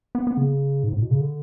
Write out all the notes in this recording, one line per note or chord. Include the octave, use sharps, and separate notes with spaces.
B3
B3
C#3
G#2
A2
B2
C#3
D3